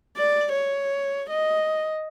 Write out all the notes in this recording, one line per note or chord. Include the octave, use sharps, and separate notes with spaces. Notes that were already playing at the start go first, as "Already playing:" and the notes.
D5
C#5
D#5